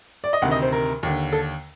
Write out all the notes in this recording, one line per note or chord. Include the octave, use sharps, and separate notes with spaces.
D5
D#5
D2 C3 D#3 F#5
D#5
C5
A#4
D#2 D3
A4